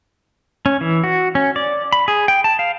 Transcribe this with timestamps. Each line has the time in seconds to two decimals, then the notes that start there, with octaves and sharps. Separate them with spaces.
0.66 C#4
0.81 E3
1.04 F#4
1.35 C#4
1.56 D5
1.93 B5
2.08 G#4
2.28 G5
2.44 A5
2.59 F5